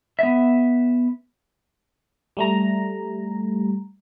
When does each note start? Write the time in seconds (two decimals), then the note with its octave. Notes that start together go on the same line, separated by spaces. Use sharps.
0.19 B3 E5
2.37 G3 A3 A#5